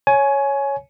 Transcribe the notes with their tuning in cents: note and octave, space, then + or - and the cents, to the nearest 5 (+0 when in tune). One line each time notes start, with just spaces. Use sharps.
C#5 +0 G#5 +20